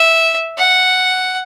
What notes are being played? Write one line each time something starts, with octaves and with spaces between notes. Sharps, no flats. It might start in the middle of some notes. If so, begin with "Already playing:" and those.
Already playing: E5
F#5